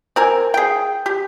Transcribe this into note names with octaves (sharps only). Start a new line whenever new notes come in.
C4 A#4 G#5
G#4 G5
G4